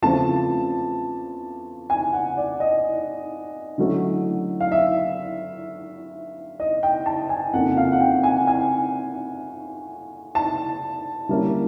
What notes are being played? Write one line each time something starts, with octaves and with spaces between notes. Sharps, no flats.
E2 C#3 F3 A3 C4 A5
G#5
F#5
D5
D#5
D3 F#3 A3 C#4 E4
F5
E5
D#5
G5
A5
G#5
F2 C#3 F3 A#3 D#4 F#5
F5
F#5
G5
G#5
G#5
A5
D3 G3 A#3 C#4 E4